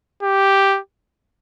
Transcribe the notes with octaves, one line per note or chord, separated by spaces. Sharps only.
G4